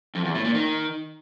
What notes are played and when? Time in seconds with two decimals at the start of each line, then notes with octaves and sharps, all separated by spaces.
0.15 F2
0.25 E2
0.35 A2
0.45 A#2
0.54 D#3